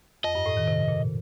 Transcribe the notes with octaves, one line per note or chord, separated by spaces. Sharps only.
F2 D#5
G2
A2
D#3
C3
A#2